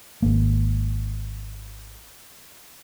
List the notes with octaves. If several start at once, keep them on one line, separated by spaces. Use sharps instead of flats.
G#1 A#3